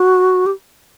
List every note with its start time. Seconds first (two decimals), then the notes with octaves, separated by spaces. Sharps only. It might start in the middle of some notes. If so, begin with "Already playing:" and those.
Already playing: F#4
0.46 G4